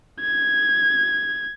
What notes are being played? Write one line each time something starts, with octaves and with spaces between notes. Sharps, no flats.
G#6